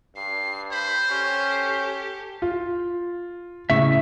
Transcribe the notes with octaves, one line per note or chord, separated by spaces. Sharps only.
G2 C7
C5 B5
C#4 G4 A4
F4
A2 C#3 E4 E5 C#6